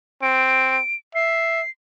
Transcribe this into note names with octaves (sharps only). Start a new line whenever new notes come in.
C4 D7
E5 C7